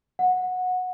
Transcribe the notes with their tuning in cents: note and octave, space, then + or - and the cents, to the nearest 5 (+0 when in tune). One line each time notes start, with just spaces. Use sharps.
F#5 -15